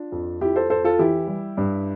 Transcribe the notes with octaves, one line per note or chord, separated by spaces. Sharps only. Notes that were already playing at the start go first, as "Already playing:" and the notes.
Already playing: D4 F4
F2
F2 E4 G4
A4 C5
F2 A4 C5
F4 A4
E3 E4 G4
G3
G2